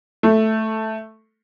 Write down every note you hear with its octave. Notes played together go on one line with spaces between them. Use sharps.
A3